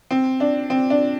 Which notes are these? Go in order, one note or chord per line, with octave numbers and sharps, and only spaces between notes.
C4
D4
C4
D4